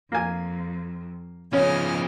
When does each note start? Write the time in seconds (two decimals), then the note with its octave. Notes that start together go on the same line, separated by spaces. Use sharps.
0.12 F2 A#3 G#5
1.53 C#3 F3 B3 C#4 D#5 G#5 F6